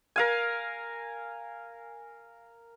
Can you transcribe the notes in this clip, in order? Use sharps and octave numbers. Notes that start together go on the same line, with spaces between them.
A#4 F5 G#5